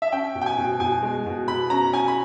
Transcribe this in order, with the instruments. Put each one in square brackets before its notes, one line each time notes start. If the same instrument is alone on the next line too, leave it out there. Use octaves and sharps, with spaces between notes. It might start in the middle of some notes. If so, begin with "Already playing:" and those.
[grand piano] E5
C#4 G5
B2
G5
G#5
B2
B2 G#5
G#3
B2
B2 B5
C#4 A#5
C#4 G#5
B5